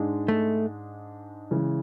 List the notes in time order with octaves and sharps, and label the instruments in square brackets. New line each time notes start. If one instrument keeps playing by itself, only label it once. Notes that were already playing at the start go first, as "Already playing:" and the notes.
Already playing: [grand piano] G#2 G#3 D4
[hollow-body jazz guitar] A3
[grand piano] C#3 E3 G#3